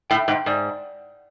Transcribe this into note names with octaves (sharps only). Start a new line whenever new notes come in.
A2 G5
G#2 G5
G#2 D5